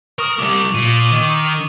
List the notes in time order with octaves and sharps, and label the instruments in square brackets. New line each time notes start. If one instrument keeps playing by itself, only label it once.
[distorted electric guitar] A#4 [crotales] C#6 D#6
[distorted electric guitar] C2 G3 [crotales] D6
[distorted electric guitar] A#2 [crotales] D#7
[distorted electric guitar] D#3